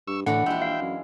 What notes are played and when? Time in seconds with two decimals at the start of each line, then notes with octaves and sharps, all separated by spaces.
0.08 G2 C#6 E6
0.26 A2 D3 E3 D4 F#4 F#5
0.46 A#1 G#3 E4 E5 G5
0.62 F5
0.81 F#2